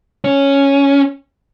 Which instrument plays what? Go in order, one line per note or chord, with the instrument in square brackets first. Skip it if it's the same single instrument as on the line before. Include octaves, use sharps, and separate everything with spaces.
[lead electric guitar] C#4